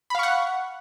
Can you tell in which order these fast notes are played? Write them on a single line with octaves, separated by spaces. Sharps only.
B5 F5 C#6 F#5